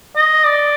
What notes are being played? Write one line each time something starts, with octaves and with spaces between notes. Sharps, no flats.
D#5
D5